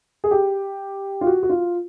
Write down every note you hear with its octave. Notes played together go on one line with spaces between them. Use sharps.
G#4
G4
F4
F#4
F#4
F4